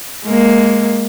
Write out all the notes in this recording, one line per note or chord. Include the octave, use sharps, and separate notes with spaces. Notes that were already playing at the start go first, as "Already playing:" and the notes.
G#3 A#3